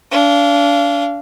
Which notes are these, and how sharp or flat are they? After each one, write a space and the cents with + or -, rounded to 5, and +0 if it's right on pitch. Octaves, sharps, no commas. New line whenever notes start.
D4 -35 F5 -25